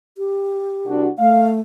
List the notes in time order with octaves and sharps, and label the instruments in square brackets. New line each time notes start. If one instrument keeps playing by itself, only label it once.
[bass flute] G4
[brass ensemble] C2 D4 F#4
[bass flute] A3 [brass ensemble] F5